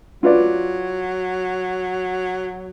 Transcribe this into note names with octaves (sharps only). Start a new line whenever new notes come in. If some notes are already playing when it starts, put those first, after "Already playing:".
F#3 F4 B4 D5